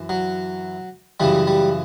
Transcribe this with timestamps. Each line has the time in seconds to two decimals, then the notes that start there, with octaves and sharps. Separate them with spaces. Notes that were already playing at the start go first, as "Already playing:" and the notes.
Already playing: F#2 E3
0.09 F#3
1.20 F#2 C#3 E3 G3
1.47 G3